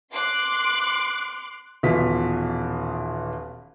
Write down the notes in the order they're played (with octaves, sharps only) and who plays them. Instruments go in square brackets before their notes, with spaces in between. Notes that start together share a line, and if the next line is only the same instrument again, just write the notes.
[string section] C6 D6 F#6
[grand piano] D#1 B2 E3 F4 B6